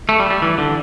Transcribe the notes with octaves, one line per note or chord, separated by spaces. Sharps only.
A3
G3
G3
E3
D3